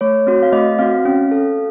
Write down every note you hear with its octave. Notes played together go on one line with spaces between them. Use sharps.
A3 C#5
C4 F#4
F5
A3 D#5
C4 F#4 F5
C#4
A4